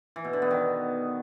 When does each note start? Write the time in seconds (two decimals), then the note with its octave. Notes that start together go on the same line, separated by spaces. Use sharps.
0.16 E3
0.25 B2
0.33 D3
0.42 B3
0.51 D#3